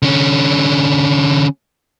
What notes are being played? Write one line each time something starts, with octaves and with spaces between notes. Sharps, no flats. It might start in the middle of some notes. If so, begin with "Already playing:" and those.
D3 C#4